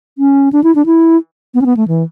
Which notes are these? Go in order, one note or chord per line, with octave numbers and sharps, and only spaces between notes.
C#4
D4
E4
D4
E4
B3
C#4
B3
A3
E3